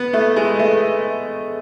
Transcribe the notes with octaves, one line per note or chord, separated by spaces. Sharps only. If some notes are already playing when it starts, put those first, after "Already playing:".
Already playing: B3
A3
G#3
A3